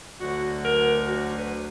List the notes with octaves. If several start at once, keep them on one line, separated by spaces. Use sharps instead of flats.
D2 D3 F#3 F#4
A#4
F#4
B4